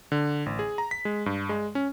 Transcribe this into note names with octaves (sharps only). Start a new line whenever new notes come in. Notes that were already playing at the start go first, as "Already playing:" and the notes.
D3
A1
G#4
A#5
B6
G#3
G2
G#3
C#4